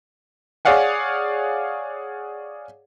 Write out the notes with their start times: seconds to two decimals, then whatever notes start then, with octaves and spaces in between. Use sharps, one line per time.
0.65 G#4 C#5 D5 F5 F#5 G#5